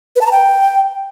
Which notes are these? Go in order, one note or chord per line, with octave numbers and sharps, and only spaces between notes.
B4
A5
A#5
G5